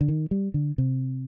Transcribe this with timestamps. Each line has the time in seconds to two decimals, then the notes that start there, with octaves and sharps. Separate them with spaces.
0.01 D3
0.08 D#3
0.31 G3
0.54 D3
0.78 C3